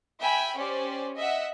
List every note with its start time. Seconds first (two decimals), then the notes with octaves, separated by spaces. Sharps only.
0.20 E5 G5 G#5 B5
0.57 C#4 G4 C5 D5
1.17 D#5 E5 F#5